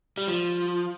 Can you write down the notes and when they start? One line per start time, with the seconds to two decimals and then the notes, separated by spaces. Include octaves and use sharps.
0.18 G3
0.27 F3